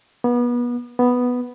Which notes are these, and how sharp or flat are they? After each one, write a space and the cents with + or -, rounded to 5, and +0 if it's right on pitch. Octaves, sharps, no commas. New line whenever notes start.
B3 -30
B3 +0